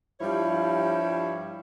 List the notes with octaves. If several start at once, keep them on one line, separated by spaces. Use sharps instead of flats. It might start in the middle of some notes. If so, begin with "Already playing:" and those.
G2 F3 G3 E4 C#5